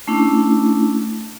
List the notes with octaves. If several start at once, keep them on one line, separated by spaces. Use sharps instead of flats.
A3 C#4 D4 E4